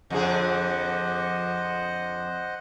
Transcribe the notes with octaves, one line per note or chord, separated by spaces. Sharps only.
F2 D3 G#4 C5 D#5 F#5